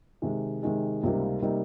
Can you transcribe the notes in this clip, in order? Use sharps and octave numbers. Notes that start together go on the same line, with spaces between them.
C3 D#3 G#3
C3 D#3 G#3
C#2 C3 G3 A#3 D#4
C3 G3 A#3 D#4